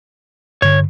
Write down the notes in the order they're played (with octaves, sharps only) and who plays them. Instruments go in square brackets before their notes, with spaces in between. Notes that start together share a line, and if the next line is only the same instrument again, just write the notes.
[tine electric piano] G2 D3 [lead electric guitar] C#5